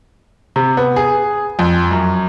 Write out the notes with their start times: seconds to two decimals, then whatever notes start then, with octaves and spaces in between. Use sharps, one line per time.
0.56 C3
0.77 B3
0.96 G#4
1.59 F2
1.91 F#2